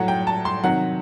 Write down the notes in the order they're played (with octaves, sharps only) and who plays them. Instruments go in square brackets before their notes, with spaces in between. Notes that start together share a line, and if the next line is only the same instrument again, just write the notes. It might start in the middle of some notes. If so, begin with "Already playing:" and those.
Already playing: [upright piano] A2 F#3 F#5
G5
A5
C6
C3 D#3 F#3 F#5